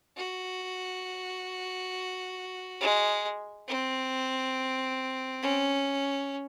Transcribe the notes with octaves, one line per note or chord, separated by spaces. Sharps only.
F#4
G#3
C4
C#4